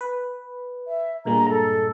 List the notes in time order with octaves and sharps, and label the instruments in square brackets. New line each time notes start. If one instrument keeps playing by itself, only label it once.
[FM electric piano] B4
[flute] E5
[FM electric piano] G2 A#2 G#3 [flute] A#5
[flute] A4